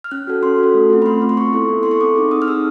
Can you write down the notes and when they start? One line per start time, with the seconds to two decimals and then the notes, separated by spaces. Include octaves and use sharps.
0.04 F6
0.11 C#4 F#6
0.27 F#4 A4
0.43 C#4 C6
0.58 F#4 A4
0.74 A3
0.90 C4 F4
1.02 B5
1.06 A3 C6
1.22 C4 F4
1.29 C6
1.37 B3 C#6
1.53 E4 A4
1.69 B3
1.83 E4 A4 C6
1.91 C#6
2.01 C4 D6
2.16 D#4 G#4
2.31 C4 D#6
2.42 F6
2.47 D#4 G#4 E6